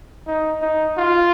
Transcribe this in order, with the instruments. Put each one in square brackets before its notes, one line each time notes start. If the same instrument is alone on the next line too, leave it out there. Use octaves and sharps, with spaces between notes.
[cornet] D#4
D#4
F4